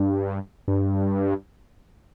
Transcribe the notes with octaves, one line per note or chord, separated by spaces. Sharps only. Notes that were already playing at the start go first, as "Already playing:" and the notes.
Already playing: G2
G2